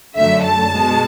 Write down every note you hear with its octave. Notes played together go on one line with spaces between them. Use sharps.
F#2 D3 F#3 A3 E5
A5
B2 G#3